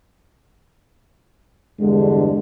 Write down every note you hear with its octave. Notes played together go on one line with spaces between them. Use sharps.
E2 G2 D3 G#3